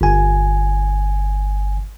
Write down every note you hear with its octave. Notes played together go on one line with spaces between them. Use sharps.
G1 G#5